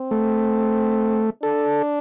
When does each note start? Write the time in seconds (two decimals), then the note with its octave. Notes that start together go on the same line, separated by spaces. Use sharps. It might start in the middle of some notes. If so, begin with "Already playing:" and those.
Already playing: C4
0.11 A3
1.43 D4 A4